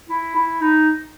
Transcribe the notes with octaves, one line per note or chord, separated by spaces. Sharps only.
E4
E4
D#4